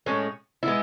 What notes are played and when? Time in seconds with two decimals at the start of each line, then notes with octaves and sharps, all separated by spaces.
0.06 A2 G#3 C#4
0.63 G#3 B3 E4